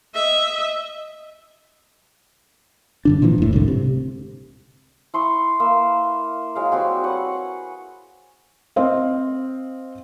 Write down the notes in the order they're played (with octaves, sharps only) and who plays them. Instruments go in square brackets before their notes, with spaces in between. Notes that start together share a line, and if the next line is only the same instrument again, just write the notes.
[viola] D#5 E5
[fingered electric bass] G2 D3 D4
A#2 D3 E3 F3
F1 A2
C2 G#2 D3
C3
[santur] E4 C6 C#6 D#6
A#3 B4 C6 E6
F#3 G#3 F5
G3 C4 F#4 G#4
B4 C#5 F#5
[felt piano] C4 C5 D#5 F5